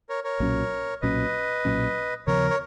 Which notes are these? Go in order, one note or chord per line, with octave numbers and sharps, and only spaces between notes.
A#4 C#5
A#4 C#5
B1 A#2 F#3 C#4
B1 A#2 F#3 C#4 B4 D#5
B1 A#2 F#3 C#4
D#2 C#3 F3 B3 A#4 C#5
C#5